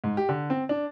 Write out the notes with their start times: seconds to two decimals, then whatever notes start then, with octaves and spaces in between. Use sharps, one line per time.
0.04 G#2
0.17 G4
0.29 D3
0.50 C4
0.69 D4